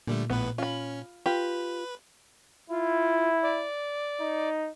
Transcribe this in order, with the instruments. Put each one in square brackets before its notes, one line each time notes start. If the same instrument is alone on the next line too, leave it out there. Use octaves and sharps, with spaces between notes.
[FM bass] A#2 [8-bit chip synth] D3 G3 A3
[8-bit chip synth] A#1 A2 B4 [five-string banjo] B3
[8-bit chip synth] C#4 [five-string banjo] F4 B5
[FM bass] F4 [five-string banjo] G4 [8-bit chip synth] B4
[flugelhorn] E4 [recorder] F4
[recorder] D5
[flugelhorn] D#4